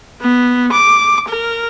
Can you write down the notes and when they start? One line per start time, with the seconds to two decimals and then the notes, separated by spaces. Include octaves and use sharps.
0.21 B3
0.72 D6
1.28 A#4